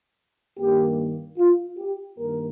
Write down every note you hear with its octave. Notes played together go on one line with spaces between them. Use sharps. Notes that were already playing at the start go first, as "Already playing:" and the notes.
G2 D#3 A#3 G4
F4
G4
G2 D#3 A#3 A#4